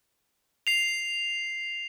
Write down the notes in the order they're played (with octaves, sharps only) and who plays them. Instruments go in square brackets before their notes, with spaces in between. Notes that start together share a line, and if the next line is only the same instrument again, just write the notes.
[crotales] C7 F7